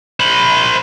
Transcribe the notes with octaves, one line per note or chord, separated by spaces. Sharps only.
C5 B5